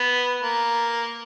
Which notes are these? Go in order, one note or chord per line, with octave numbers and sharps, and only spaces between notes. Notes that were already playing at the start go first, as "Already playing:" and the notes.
Already playing: B3
A#3